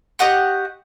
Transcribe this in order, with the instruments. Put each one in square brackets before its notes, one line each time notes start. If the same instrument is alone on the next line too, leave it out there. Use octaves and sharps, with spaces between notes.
[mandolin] G4 D#5 F#5 C#6